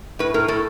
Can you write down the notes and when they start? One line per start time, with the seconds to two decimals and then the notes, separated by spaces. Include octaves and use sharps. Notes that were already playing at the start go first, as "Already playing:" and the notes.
0.19 A2 B4
0.34 A2 A#4
0.48 A2 A4